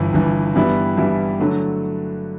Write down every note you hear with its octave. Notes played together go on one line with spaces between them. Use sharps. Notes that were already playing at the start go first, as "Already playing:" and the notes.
Already playing: G1 G2 E3
G1 G2 E3
G2 E3 G3 B3 E4
G2 E3 G3 B3 E4
D3 F#3 A3